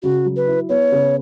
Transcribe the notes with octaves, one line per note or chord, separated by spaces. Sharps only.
C#3 F#4
F#3
B4
E4
B3 C#5
C#3